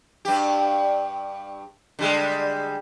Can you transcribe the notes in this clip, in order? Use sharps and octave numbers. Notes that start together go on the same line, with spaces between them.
G2 G4
D3 G3 G#3